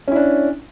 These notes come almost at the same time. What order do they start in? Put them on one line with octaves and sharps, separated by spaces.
C#4 E4 D4